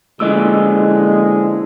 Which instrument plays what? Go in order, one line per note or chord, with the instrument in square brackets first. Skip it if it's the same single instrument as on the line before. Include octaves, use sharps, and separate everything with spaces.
[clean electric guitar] A#2 E3 [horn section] D3 F3 G#3 [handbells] D#5 E6